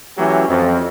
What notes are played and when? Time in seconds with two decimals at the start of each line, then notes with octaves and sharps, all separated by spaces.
0.18 E3 F#3 A3 C#4 G4
0.48 F2